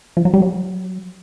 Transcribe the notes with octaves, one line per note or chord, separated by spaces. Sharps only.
F3
F#3
G3
F#3